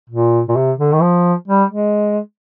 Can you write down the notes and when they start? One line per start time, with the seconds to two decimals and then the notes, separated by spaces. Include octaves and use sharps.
0.10 A#2
0.48 A#2
0.56 C3
0.79 D3
0.92 D#3
1.01 F3
1.48 G3
1.70 G#3